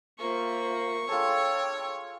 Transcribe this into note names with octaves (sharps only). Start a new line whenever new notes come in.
A#3 F4 C5 E5 C#6
D4 F4 G#4 A4 C#5 G5 E6